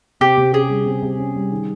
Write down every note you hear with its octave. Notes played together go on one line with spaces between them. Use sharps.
C3 G4
C3
C#4 G#4
G3
C3
C3
C#4
G3
D#3